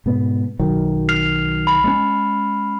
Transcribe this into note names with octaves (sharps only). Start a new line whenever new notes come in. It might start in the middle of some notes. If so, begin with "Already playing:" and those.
G#2 B2 B3
B1 D#3 F#3
F6 C7 F7
B5
G#3 C4 C#4